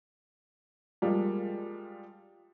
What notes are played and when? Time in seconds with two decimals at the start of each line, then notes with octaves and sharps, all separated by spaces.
1.02 F3 G3 G#3 A#3